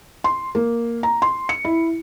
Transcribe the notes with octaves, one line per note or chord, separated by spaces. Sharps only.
C6
A#3
A#5
C6
C#7
E4